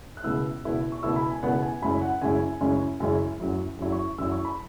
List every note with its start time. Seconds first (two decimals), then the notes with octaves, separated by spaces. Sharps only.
0.17 F#6
0.24 C#2 B2 B3 E4 E6
0.64 C#2 B2 B3 E4
0.92 C#6
1.03 C#2 B2 B3 E4 E6
1.16 B5
1.30 G#5
1.43 C#2 B2 B3 E4 F#5
1.63 G#5
1.82 F#2 C#3 G#3 C#4 E4 B5
2.02 F#5
2.22 F#2 C#3 G#3 C#4 E4 G#5
2.61 F#2 C#3 G#3 C#4 E4
3.00 F#2 C#3 G#3 C#4 E4
3.40 F#2 F#3 E4
3.79 F#2 F#3 E4
3.92 C#6
4.18 F#2 F#3 E4 E6
4.32 C#6
4.45 B5